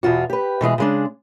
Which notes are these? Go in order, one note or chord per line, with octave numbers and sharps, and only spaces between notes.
E2 B2 F4 F#4
G4 B4
B2 E3 G#3 G#4
C#3 G#3 D4